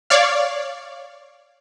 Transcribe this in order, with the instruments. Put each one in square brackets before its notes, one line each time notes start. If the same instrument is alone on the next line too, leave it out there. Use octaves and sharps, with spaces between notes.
[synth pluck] C#5 D5 F5